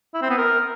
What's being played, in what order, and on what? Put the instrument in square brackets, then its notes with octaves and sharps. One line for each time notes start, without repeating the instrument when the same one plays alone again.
[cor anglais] E4
C4
B3
A#4